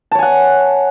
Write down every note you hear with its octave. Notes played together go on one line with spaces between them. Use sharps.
C#5 F#5 G#5 A5